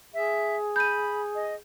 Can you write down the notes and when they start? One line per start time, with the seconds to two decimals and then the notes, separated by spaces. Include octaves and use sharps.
0.14 G#4 E5
0.76 B5 G6 D#7
1.35 D#5